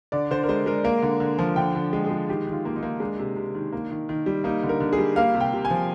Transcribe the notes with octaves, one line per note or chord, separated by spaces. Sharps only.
D3 D5
D3 C5
A#4
G#3 C5
G#3 A#4
A#3 A#4
D3
D3
F3
D3 G5
D3
G#3
G#4
G#3
D#3 G4
D#3
F4
A#3
D#4
A#3
G#3 D4
C3
C3
D#3
A#3
D#3
D#3
G3
A#3 D#4
D3
A#4
D3
G#4
G3
A#3 F5
C3
G5
C3
G#5
F3